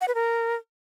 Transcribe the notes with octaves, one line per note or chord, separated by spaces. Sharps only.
F#5
B4
A#4